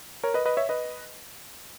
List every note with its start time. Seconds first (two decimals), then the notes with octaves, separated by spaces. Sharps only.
0.24 A#4 C#5
0.34 B4 D#5
0.45 B4 D#5
0.57 C#5 E5
0.69 B4 D#5